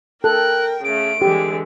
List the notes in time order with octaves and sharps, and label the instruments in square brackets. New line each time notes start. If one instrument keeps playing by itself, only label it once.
[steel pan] A4 [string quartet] A#4 G5 [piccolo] F#6
[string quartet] C#3 A3 [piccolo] D7
[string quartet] D3 E3 G#3 [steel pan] G4